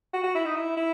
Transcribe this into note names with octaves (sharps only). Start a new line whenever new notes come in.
F#4
F#4
E4
D#4
E4
E4